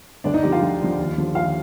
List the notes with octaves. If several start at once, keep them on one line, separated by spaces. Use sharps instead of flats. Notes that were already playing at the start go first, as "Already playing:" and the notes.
D2 D4 D5
D#4 D#5
D3 F3 G4 G5
F4 F5
D2
D3 F3
D#2
D3 F3
D#2 F4 F5